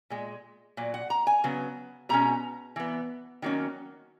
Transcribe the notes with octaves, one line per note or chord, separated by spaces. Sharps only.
A#2 G#3
A#2 F#3
F#5
A#5
G#5
C#3 F#3 B3
B2 G#3 C#4 A#5
E3 B3
D#3 F#3 A#3 C#4